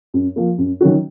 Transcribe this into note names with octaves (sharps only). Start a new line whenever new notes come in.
F#2
F3 A#3
F#2
D#3 F#3 C#4 F#4